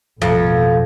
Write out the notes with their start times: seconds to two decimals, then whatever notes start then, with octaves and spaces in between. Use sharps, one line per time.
0.22 A1 F2 B2